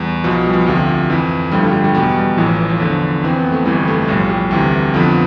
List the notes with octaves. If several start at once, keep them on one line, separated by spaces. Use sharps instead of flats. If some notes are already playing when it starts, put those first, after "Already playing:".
Already playing: E2 G3
B1 B2 F3
G3
F3
D2 C3 F3
F2 E3
G1 G2 D3 F3 G3
A3
G3
G3
E2 B2 G3
G3
A1 A2 E3 F3
F3
E2 D3 F3
F2 E3 C4
B3
A3
G1 F2 E3 G3
A3
B1 A2 F3 G3
G3
D2 C3 E3
F2 D3 F3 B3